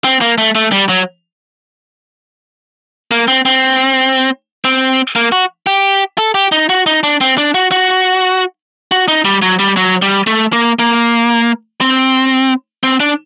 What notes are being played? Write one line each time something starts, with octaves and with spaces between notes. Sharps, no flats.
C4
A#3
A3
A3
G3
F#3
A#3
C4
C4
C4
A#3
F#4
G4
A4
G4
D#4
F#4
D#4
D4
C4
D4
F#4
F#4
F#4
D#4
G3
F#3
G3
F#3
G3
A3
A#3
A#3
C4
C4
D4